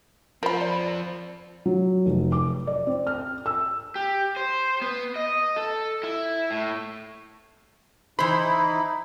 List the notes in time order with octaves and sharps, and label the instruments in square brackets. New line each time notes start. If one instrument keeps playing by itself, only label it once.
[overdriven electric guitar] F3 C4 [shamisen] A#4 B5
[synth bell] D5
[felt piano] F#3
F1
D6
D5
C4
F6
E6
[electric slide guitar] G4
C5
B3
D#5
A4
E4
A2
[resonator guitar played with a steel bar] E3 C5 [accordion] D#4 E4 [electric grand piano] B5